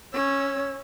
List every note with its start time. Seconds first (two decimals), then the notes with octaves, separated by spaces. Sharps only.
0.13 C#4 C#5 E6